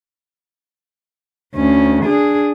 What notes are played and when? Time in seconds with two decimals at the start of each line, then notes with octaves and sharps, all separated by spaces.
1.55 D2 C#4
2.04 D4 G#4